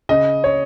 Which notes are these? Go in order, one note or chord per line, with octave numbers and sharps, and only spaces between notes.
C#3 D#5
C#5